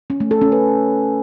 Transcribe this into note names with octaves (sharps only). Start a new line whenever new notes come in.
C#4
A3
A4
C#4
B4